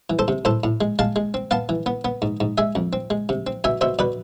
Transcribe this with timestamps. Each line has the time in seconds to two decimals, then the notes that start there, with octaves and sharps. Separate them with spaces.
0.10 E3
0.19 A4 C5
0.28 C3
0.45 A2 A4 C5
0.64 A2
0.81 G#3
0.99 G#3 F5 A5
1.16 G#3
1.34 C4
1.51 B3 F5 A5
1.69 E3
1.86 B3
2.05 B3
2.22 G#2
2.40 G#2
2.58 G#3 E5 G#5
2.75 F2
2.93 C4
3.10 G#3
3.29 C3
3.47 C4
3.64 B2 E5 G#5
3.81 B2 C5 E5
3.99 B2 B4 D5